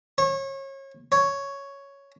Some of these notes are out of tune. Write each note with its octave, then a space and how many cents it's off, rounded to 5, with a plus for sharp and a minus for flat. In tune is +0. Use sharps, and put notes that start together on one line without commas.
C#5 -30
C#5 +5